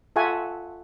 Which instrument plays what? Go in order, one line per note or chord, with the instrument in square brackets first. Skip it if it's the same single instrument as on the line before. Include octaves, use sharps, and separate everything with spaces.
[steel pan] F4 A4 E5 F#5 G#5 C#6